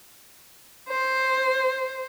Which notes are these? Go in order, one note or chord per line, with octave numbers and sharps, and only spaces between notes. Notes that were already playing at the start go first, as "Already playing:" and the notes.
C5